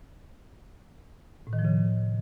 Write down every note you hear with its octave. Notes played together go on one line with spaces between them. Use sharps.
A2
D#3
F3
C#3